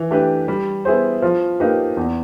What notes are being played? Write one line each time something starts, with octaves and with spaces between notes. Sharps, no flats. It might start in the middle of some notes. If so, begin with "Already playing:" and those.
Already playing: E3
A3 D4 G4 B4
G3
B3 E4 G#4 C5
F3
A#3 D#4 G4 B4
E2